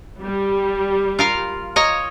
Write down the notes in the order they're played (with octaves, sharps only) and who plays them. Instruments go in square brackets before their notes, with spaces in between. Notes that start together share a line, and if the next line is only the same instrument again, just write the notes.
[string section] G3
[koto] F4 A#4 F5
C#5 D#5 A#5